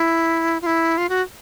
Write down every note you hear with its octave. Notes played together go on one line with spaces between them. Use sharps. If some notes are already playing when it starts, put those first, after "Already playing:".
Already playing: E4
F4
E4
F4
F#4